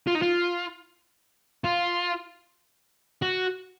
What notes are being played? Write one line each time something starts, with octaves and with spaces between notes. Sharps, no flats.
F4
D#4
F4
F4
F#4